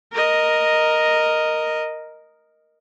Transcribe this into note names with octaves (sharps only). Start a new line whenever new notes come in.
A#4 D#5